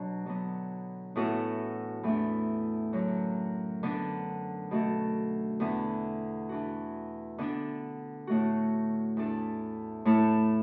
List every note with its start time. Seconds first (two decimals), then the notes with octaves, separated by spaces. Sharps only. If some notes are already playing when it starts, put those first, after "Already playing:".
Already playing: B2 F#3 D4
0.26 D3 F#3 B3
1.16 A2 E3 B3 F#4 A4
2.03 E2 E3 A3 D4
2.93 F#2 D3 F#3
3.83 D3 B3 D4
4.71 B2 A3 F#4 A4
5.60 E2 D3 B3
6.49 E3 D4 F#4
7.38 D3 B3 D4
8.27 A2 A3 F#4
9.17 E2 E3 D4 A4
10.05 A2 A3 E4 A4